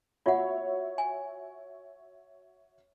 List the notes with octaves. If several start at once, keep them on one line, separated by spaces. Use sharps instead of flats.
F4 F#4 C#5 E5 F#5
G#5